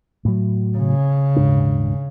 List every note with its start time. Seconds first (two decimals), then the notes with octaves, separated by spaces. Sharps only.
0.25 A2 F#3
0.77 C#3
1.36 D#1 G#2 D4